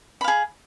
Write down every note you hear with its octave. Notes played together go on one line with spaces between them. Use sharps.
G#4 F5 B5